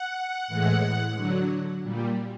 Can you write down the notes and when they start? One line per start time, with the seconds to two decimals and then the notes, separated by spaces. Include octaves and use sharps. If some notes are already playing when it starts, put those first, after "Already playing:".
Already playing: F#5
0.48 A2 E3 G#3
1.15 D3 F#3
1.82 A#2 G3